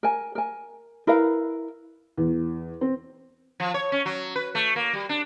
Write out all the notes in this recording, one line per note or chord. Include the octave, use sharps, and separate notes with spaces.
A#4 G#5
A#4 G#5
E4 A#4 B4 F5
E2
C4
F3
C#5
C#4
F#3
B4
A3
A#3
G3
D4